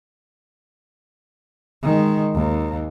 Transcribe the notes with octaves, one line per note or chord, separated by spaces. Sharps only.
D#3 G#3
D#2